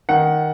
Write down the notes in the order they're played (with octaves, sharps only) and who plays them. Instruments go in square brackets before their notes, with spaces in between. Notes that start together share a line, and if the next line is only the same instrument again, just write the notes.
[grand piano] D#3 F#5